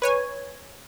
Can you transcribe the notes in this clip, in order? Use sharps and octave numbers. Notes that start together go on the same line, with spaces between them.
B4 C#5 G#5